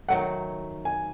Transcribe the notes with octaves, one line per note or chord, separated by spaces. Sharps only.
D#3 F#3 A3 F#5
G#5